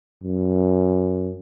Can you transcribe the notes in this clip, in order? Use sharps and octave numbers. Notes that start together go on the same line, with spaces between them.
F#2